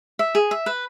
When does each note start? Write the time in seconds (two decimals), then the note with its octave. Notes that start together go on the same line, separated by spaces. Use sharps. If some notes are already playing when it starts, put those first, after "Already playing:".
0.19 E5
0.35 G#4
0.51 E5
0.66 B4